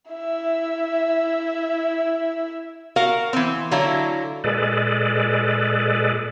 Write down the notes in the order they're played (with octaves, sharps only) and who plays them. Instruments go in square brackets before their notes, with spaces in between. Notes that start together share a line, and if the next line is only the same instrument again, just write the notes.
[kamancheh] E4 E5
[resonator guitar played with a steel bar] F#4 A#4 F5
E3 C4
D3 F#3 E4 F5
[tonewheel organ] A#2 G#3 G#4 A4 B4 D5